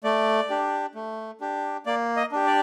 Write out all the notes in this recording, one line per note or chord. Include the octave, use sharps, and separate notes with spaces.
A3 D5
D4 G4
A3
D4 G4
A#3 D5
D#5
D4 G4
D5